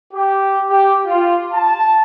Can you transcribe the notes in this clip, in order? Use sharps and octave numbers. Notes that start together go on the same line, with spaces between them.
G4
G4
F4
A5